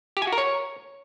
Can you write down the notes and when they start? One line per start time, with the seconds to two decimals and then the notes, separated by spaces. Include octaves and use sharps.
0.17 G4
0.22 G#5
0.27 F#4
0.32 A#4
0.38 C#5